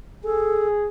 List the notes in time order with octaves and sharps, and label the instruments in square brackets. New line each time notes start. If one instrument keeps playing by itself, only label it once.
[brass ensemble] G#4 [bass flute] A4